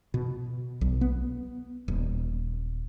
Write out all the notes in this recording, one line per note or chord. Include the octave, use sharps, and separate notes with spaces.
B2
B1
B3
D#1